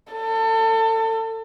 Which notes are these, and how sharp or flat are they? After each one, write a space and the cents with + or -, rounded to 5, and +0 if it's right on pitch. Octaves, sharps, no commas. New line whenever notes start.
A4 +30